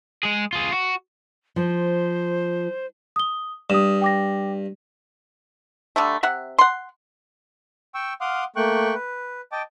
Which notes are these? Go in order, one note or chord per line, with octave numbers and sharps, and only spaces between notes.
G#3 G#4
F4 G#4
F#4
F3 C5
D#6 G7
G2 D#6 E7
G5 D6 A#6
D3 G3 A3
C3 E5 F#5
F#5 C6
G5 C#6 E6
F5 F#5 C6 D6 D#6 F6
A3 A#3 G5 C#6 F#6
B4
D#5 G5 A5 D6